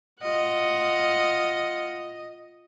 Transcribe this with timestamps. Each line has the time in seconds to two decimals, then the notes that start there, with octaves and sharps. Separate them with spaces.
0.22 F4 D#5 F#5